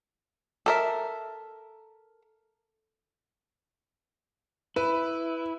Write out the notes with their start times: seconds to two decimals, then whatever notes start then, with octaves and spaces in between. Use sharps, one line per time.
0.66 A4 A#4 E5
4.76 E4 B4